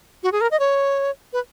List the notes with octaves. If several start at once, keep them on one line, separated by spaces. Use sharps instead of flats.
F#4
G#4
A#4
D#5
C#5
B4